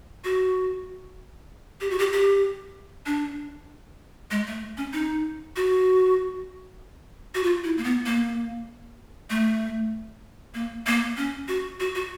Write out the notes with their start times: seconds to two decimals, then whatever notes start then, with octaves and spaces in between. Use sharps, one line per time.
0.24 F#4
1.81 G4
1.90 F#4
1.99 G4
2.13 G4
3.06 D4
4.31 G#3
4.47 A3
4.77 C#4
4.93 D#4
5.56 F#4
7.35 F#4
7.43 F4
7.64 E4
7.78 A#3
7.84 B3
8.06 A#3
9.30 A3
10.54 A#3
10.87 A#3
11.17 C#4
11.48 F#4
11.80 F#4
11.95 F#4